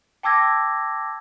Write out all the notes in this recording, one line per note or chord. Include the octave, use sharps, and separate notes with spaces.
G5 A5 D6 E6 G#6 A#6